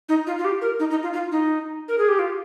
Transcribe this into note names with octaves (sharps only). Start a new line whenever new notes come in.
D#4
F4
F4
G4
A#4
D#4
D#4
F4
F4
D#4
A#4
G#4
G4
F4